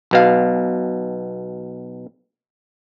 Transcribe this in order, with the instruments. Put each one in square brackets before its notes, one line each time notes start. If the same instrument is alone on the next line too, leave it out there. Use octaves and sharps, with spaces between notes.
[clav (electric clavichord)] B1 B2 F5